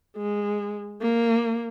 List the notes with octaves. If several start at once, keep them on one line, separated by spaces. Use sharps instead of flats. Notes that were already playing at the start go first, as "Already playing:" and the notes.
G#3
A#3